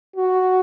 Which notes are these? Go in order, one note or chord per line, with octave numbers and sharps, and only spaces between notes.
F#4